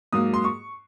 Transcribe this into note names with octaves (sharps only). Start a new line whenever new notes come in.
G#2 F#3 A#3 D#6
C6
C#6